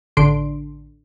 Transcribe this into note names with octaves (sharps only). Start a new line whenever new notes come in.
A1 D3 D4 C6 D7